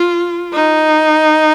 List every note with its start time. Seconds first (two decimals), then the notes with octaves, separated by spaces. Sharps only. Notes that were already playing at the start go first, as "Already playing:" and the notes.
Already playing: F4
0.53 D#4